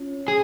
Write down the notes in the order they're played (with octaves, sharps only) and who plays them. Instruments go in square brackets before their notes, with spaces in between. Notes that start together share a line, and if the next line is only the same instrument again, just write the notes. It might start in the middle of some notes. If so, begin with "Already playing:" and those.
Already playing: [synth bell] C#4 F4 C#5
[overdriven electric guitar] G#4